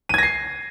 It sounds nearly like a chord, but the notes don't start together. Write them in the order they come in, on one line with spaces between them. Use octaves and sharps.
D#7 G#6 A#6 C7